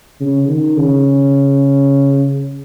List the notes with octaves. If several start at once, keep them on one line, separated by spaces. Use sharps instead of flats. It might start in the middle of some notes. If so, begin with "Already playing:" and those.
C#3
D#3
C#3